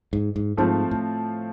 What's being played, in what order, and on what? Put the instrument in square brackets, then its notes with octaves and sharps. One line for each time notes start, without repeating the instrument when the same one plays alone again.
[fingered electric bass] G#2
G#2
[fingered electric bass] G#2 [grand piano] F3 A3 C4 F4
[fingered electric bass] A2